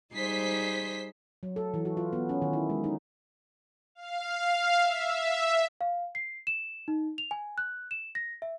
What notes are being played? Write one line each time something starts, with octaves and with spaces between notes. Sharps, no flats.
G3 D#4 G#4 C5 B6 C7
F#3
A4
E3
F#4
F4
B3
C#4
D#3
E4
G#3
D#4
F5
E5
F5
C7
E7
D#4
F7
G#5
F#6
E7
A#6
E5